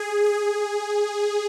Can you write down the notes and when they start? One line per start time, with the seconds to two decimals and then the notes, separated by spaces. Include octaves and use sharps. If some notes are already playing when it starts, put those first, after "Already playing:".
Already playing: G#4
0.24 G#4